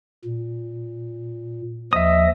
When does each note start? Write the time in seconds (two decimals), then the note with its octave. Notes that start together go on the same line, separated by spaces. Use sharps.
0.25 A#2
1.93 D#2 F3 D#5 E5 D#6